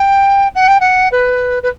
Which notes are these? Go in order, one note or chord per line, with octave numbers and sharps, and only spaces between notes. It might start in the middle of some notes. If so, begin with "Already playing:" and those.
Already playing: G5
F#5
G5
F#5
B4
B4